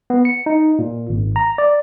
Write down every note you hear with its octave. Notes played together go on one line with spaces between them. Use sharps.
B3
C#7
D#4
A#2
G#1
A#5
D5